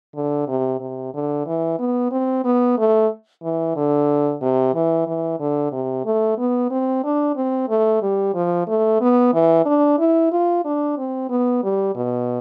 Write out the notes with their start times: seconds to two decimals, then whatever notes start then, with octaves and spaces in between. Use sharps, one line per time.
0.15 D3
0.48 C3
0.80 C3
1.14 D3
1.46 E3
1.79 B3
2.11 C4
2.45 B3
2.78 A3
3.43 E3
3.76 D3
4.42 C3
4.74 E3
5.07 E3
5.40 D3
5.72 C3
6.05 A3
6.38 B3
6.71 C4
7.04 D4
7.36 C4
7.69 A3
8.02 G3
8.34 F3
8.68 A3
9.01 B3
9.34 E3
9.65 D4
9.98 E4
10.32 F4
10.65 D4
10.97 C4
11.30 B3
11.63 G3
11.95 B2